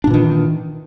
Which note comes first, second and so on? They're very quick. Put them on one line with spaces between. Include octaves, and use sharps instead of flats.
D4 A#2 E3 D#3